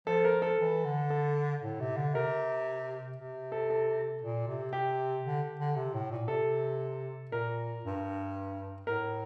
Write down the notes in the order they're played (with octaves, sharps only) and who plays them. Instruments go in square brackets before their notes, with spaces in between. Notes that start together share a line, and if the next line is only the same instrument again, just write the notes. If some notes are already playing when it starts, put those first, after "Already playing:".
[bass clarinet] F3 [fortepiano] A4
[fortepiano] A#4
A4
[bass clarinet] E3
D3
[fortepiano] A4
[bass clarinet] A2
C3
D3
[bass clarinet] C3 [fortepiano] A#4
[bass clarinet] C3
[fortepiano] A4
A4
[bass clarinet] A#2
C3
[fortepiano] G4
[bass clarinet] D3
D3
C3
A2
A#2
[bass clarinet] C3 [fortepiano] A4
[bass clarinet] A#2 [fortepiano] A#4
[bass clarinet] G2
[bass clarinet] A2 [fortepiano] A#4